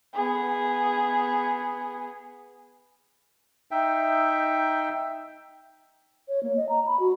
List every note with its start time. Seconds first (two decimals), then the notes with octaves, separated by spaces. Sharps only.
0.14 B3 G#4
3.71 D#4 E5 G5
6.29 C#5
6.43 A#3
6.56 D#5
6.69 A#5
6.86 B5
6.99 F#4